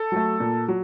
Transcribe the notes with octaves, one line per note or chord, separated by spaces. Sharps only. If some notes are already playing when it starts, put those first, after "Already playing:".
Already playing: A4
F#3 A3
A#2
F#3